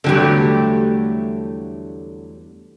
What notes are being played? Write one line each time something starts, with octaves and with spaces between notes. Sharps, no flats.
E2 D3 F#3 G3 A3 G4